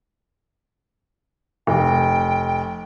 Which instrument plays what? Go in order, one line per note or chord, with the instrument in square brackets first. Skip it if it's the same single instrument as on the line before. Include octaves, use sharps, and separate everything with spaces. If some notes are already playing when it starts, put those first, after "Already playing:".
[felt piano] F1 [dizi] G5